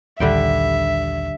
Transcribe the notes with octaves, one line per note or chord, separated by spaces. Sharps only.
A#1 D#2 D3 G3 E5 G5